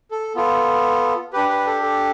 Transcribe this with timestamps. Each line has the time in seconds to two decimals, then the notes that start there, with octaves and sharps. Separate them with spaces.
0.11 A4
0.36 B3 F4 A4
1.33 D4 G4 B4
1.49 B4
1.66 A4
1.82 A4